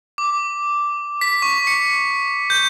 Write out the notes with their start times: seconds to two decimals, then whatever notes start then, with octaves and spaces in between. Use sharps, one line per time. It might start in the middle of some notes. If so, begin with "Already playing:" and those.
0.18 D6
1.21 B6
1.42 C#6
1.67 C#7
2.50 G6